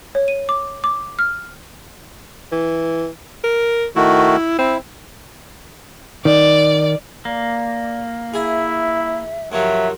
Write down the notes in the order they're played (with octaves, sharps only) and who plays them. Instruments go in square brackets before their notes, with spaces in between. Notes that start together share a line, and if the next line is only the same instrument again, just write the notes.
[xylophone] C#5
D#7
D6
D6
F6
[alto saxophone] E3
A#4
[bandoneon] D#3 A3 F#4 [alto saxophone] E4
[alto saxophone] C4 [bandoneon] E4
[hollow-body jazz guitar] D#3 [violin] D5
[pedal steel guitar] A#3 [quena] D5
[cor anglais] E4 [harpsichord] G#4 G#5 [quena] E5
[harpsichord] G2 D#3 F3 [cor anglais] F#3 [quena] E5